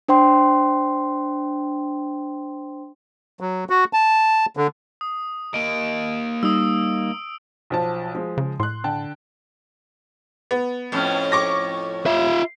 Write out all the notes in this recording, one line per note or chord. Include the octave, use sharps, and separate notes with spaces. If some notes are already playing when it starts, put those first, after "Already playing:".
D4 C5 G5 C6
F#3
F#4
A5
D3
D#6
A#3 D#5 D7
G3 D#4 D#6 E6
B1 F3 A5
F3 G#3
C#3
A2 C6 F#6
D3 G5 A5
B3
F2 A2 C#4
C#6 D6 A#6
F4 E5